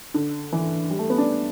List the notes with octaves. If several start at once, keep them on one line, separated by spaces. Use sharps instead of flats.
D3
E3
G3
A3
B3
D4